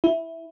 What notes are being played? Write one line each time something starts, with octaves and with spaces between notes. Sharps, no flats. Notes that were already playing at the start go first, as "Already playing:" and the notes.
E4